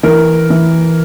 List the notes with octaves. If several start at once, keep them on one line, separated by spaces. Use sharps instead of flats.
E3 A#4
E3